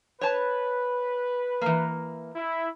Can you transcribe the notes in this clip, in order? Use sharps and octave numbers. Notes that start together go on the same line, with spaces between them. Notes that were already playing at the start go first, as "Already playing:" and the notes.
B4 C#5 A5
E3 A#3
E4